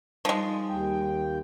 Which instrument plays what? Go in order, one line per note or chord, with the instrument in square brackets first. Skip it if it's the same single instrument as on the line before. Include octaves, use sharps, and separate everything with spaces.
[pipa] F3 G#3 [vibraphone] G3 D#4
[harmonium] D#2 G5